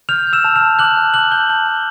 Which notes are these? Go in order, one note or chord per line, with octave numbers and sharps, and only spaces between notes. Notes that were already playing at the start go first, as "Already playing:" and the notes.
F6 G6 F7
G6
E6 E7
A5
F6 F7
A5
D6 F#6 F#7
A5
D6 F#6 F#7
A5 G6 G7
A5 F#6 F#7
A5